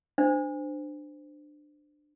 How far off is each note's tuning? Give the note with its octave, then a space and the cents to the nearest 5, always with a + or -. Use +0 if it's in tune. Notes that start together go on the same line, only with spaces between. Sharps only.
D4 +20 C5 -20